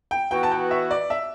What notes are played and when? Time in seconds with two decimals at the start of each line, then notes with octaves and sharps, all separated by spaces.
0.11 G5
0.31 E3 B3 F#4 G5
0.43 A5
0.51 G5
0.71 E5
0.91 D5
1.10 E5